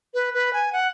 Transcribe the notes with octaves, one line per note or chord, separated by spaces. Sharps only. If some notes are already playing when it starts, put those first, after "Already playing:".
B4
B4
G#5
F#5